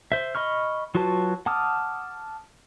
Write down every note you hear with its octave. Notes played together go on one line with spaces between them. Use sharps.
C5 E5
D#5 B5 C#6 F6
F#3 F4 F#4 B4 A5
F#5 A5 D6 D#6 F6